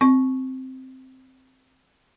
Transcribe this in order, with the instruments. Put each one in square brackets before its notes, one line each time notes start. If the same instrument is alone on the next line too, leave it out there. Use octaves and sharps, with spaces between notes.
[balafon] C4 C#6